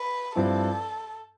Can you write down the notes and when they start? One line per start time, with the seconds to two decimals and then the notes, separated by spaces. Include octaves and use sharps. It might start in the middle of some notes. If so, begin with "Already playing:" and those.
Already playing: B4
0.36 G2 F3 C4 E4 A4